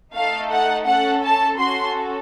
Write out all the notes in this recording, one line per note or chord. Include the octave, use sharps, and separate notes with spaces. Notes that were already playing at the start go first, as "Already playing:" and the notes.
A3 D#4 A4 F5
F#5
C#4 A4 F#5
A5
C#4 F#4 A4 C6